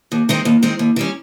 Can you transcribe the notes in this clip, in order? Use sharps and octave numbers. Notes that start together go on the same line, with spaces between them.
D#2
D#3 G#3 C4
D#2
D#3 G#3 C4
D#2
D#3 G3 C#4